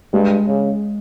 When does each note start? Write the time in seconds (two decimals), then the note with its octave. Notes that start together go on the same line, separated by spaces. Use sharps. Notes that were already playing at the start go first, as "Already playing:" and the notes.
0.13 G2 G#3
0.48 C#3